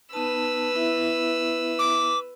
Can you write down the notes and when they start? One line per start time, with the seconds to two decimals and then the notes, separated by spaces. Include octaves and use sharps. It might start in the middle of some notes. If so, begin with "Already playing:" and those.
0.13 B3 D#4 B4 A5 E6
0.75 B3 E4 E5
1.79 D6